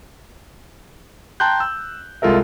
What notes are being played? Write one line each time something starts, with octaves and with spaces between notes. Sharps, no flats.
G5 A5 A#5 C6 F#6 G6
E6
C2 G#3 F4 A4 A#4 E5